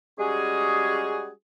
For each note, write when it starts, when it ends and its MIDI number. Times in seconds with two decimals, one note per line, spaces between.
0.19 1.29 55
0.19 1.29 56
0.19 1.29 61
0.19 1.29 66
0.19 1.29 68